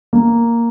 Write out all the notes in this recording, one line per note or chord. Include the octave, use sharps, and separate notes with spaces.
A#3